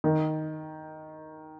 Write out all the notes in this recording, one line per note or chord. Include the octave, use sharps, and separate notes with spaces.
D#3